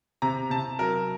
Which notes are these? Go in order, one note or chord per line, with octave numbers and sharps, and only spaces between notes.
C3 A#5
C3 A5
F#3 A#4